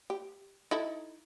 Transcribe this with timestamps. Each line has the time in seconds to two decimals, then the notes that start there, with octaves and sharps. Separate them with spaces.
0.10 G4
0.71 D#4 E4 A4